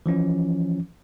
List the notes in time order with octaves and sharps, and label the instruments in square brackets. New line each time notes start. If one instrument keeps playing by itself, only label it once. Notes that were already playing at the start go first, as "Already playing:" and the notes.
[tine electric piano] E3 F3 C#4